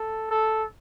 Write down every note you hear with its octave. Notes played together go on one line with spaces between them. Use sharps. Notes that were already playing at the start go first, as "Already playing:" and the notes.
Already playing: A4
A4